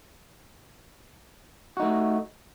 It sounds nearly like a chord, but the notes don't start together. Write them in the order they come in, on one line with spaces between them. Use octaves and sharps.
F#4 D#4 A3